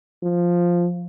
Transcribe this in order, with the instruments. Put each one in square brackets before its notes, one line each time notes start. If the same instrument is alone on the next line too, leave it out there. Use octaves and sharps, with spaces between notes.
[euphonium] F3